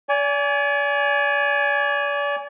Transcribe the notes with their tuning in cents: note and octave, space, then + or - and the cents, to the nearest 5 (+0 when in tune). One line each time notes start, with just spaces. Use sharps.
D5 -40 G#5 +0